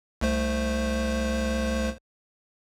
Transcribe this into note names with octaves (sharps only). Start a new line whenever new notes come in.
C2 A3 C5